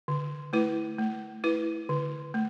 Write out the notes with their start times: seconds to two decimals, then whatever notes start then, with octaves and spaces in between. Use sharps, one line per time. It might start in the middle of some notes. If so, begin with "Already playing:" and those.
0.08 D3
0.53 A3 E4 B4
0.99 A3
1.44 E4 B4
1.89 D3
2.34 A3